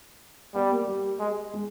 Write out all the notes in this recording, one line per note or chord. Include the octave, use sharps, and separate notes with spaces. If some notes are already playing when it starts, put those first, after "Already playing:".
G3 B3
A#3
G3
G#3
G#3